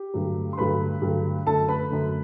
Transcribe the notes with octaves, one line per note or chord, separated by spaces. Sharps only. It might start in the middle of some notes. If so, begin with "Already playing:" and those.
Already playing: G4
G2 D3 F#3 A3
C6
G2 D3 F#3 A3 B4 B5
G2 D3 F#3 A3
F#2 D3 A3 A4 A5
B4 B5
F#2 D3 A3